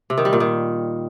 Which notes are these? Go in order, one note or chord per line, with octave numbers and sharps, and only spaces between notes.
C3
D#3
G3
A#2
D#3